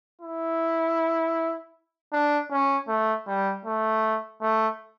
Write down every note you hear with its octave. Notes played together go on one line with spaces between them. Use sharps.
E4
D4
C#4
A3
G3
A3
A3